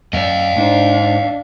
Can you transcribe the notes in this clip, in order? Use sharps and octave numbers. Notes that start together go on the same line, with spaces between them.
F#2 D5 D#5 F5
G#2 D4 D#4 C5